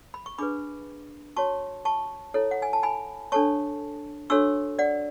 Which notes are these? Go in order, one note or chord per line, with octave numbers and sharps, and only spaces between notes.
B5
C#6
D4 G#4 B4 B5 D6
F#4 C#5 A5 C#6
A5 C#6
E4 A4 C#5
F#5
G#5
A5
G#5 B5
D4 A4 C#5 A5 C#6
D4 F#4 A4 C#5 C#6 E6
D5 F#5